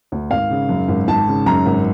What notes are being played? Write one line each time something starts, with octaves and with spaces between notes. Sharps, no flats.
D2
G#1 F5
C#3
F#2
G#1
G#1 A5
C#3
F#2 A#5
G#1